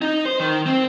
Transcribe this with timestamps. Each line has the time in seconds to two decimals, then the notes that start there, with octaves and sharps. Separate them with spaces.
0.02 D#4
0.25 C5
0.40 D#3
0.66 C4